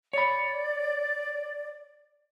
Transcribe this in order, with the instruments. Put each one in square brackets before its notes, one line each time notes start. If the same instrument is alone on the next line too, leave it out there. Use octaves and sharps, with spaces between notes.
[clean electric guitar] C#5 B5 [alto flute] D5